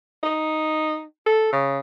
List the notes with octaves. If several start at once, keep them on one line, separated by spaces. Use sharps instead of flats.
D#4
A4
C#3